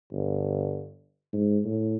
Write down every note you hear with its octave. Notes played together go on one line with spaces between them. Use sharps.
G1
G#2
A2